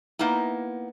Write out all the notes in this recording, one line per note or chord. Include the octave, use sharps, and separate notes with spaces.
A#3 B3 D#4 E4